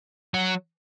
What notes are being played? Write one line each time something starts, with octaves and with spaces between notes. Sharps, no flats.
F#3